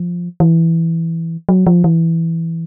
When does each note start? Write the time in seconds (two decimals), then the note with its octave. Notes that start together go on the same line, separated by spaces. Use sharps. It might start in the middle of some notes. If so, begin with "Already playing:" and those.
Already playing: F3
0.40 E3
1.49 F#3
1.67 F3
1.84 E3